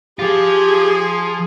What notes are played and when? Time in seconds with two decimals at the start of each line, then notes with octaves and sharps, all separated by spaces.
0.19 F3 F4 G4 G#4